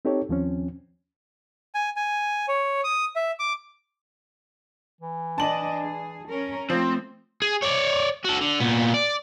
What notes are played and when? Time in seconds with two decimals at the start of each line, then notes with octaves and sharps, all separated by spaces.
0.05 C4 D#4 G4 A4 C#5
0.29 D#2 F3 C4 C#4
1.75 G#5
1.96 G#5
2.48 C#5
2.84 D#6
3.16 E5
3.40 D6
5.01 E3
5.38 D4 D#5 A5 F#7
5.80 G#4
6.28 C#4 A#4
6.70 F3 A3 C4
7.42 G#4
7.63 C#5 D5
8.24 F#4 A4
8.41 D3
8.60 A#2 B3
8.94 D5